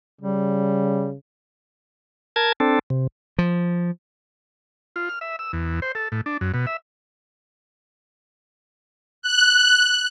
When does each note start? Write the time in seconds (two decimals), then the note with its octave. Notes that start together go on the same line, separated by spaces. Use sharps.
0.21 C#3 G3
2.36 A#4 A5 G#6
2.60 C4 D4 A4
2.90 C3
3.38 F3
4.96 F4
5.09 F6
5.21 E5
5.39 E6
5.53 E2
5.82 C5
5.95 A4
6.12 A2
6.26 D4
6.41 F#2
6.54 B2
6.67 E5
9.22 F#6